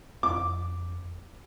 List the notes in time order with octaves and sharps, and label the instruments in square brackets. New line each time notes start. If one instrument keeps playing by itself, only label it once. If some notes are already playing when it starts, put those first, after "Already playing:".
[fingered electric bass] F2 C4 [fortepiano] D6